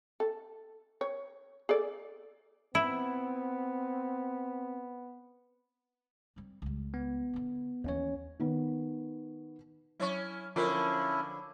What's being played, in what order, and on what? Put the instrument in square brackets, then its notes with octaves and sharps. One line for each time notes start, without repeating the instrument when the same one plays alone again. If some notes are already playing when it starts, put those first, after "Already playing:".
[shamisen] A4
C#5
G#4 A4 D5
[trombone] B3 [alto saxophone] C4 [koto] E4
[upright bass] G3 C4
C#2 G3
[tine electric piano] B3
[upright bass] D3 D4
[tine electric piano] D#2 C#4 C#5 [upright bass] E3 B3
[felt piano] D#3 B3 B4
[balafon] F#3 C#5 C#6 [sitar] C#4 E4
[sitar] D3 F3 D4 [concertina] C#4 E4 [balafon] F4 A#4